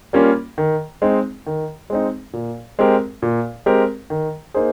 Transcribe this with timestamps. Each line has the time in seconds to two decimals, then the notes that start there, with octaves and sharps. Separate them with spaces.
0.13 G3 A#3 C#4 F4
0.58 D#3
1.02 G#3 C4 D#4
1.47 D#3
1.90 G#3 C4 D#4
2.33 A#2
2.79 G#3 C4 G4 A#4
3.22 A#2
3.66 G#3 C4 G4 A#4
4.10 D#3
4.54 A#3 D#4 G#4 C5